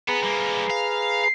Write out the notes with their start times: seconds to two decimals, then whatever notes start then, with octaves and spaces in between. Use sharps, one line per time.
0.09 B3 G#4 B4 A#5
0.24 G3 A#3
0.70 F5